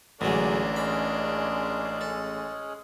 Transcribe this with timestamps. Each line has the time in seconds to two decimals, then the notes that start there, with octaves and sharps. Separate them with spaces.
0.21 A1 D3 F#3 G#3 A#3 D4
0.76 G#3 C#4 G#4 B5
2.01 A4